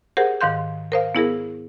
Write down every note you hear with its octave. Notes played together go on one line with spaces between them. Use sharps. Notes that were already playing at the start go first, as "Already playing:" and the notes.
G4 G#4 A#4 C5 F#5
G#2 D#3 F5 C6 G6
A#4 C5 F5
B3 E4 G#4 A#4